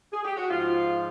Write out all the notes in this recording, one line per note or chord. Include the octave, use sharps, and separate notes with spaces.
G#4
G4
F#4
G#2 F3 F4